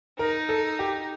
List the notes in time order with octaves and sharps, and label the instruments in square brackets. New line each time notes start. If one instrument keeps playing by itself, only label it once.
[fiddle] D#4 [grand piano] A#4
[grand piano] A4
G4